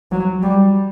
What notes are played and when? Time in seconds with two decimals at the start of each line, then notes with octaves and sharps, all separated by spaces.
0.12 F#3
0.43 G3